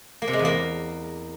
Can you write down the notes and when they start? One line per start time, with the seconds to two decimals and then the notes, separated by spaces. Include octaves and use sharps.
0.22 A#3
0.28 C3
0.33 G#3
0.39 E2
0.45 A#3